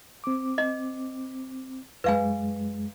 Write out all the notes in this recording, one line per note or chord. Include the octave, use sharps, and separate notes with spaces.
C4 D6
D#5
F#2 G#3 B4 F5 G#5